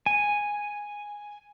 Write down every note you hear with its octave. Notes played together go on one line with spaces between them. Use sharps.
G#5